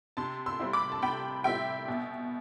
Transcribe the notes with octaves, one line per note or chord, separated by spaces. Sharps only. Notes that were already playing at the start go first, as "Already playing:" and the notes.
C3 A5 C6
C6 E6
G3 C4 E4
B5 D6
A5
C3 G5 B5
G3 C4 E4 E5 G5
B2